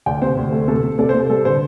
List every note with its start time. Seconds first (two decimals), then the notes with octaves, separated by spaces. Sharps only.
0.06 D2 D5 G5
0.22 C3 C5
0.37 D2
0.52 A3
0.68 C3 A4
0.84 C3
0.99 C3 A4 D5
1.09 C5
1.14 C3
1.19 A4
1.29 G3 A4
1.45 D3 C5